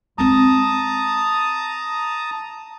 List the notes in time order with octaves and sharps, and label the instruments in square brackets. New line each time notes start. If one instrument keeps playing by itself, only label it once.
[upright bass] G#3 C4 [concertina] A5 A#5 D#6